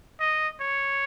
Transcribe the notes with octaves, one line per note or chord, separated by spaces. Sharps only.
D#5
C#5